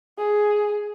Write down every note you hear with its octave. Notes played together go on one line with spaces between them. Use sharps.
G#4